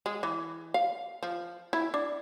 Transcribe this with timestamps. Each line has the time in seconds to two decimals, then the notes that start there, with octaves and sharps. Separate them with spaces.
0.06 G#3
0.23 E3
0.74 F5
1.23 F3
1.73 E4
1.94 D4